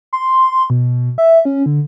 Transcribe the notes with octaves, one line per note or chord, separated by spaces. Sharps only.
C6
B2
E5
C#4
D3